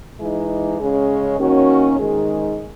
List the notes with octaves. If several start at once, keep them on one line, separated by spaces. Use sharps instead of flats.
E3 G#3 D#4
C#3 G#3 C#4
D#3 A#3 C#4 F#4
G#2 D#3 G#3 D#4 G#4